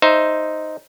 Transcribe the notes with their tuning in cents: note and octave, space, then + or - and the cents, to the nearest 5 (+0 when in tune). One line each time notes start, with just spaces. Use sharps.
D#4 +0 C5 +0 E5 +0